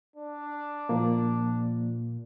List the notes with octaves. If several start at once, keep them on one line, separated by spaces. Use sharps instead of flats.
D4
A#2 F3 A#3